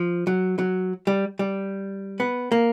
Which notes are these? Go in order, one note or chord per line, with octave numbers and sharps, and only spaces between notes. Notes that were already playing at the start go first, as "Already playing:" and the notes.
Already playing: F3
F#3
F#3
G3
G3
B3
A#3